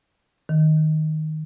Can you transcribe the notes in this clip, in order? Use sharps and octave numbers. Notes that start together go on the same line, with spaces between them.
D#3